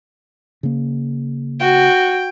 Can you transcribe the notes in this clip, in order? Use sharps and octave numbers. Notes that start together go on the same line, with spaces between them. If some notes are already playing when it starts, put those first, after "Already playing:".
C#3 A#3
F#4 G5